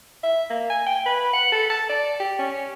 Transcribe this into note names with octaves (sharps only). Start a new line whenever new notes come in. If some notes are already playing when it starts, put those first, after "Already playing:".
E5
A#3
G#5
G5
B4
F#5
A4
A5
D5
G4
C#4